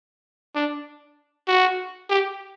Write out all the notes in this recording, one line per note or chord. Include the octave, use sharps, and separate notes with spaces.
D4
F#4
G4